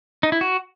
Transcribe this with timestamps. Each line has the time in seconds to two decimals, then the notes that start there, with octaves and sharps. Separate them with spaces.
0.23 D#4
0.32 E4
0.41 F#4